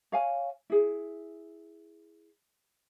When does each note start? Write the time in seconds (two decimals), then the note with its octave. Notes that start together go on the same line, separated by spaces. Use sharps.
0.12 C#5 F5 G#5
0.70 E4 G#4